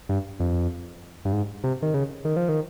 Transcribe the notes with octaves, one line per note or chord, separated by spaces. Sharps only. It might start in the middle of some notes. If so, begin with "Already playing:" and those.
G2
F2
G2
G#2
C3
D#3
C#3
D#3
F3
D#3